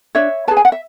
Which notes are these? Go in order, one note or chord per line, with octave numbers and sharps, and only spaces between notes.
D4 C#5 E5
G#4 B4 A5
G#5
F#5
E5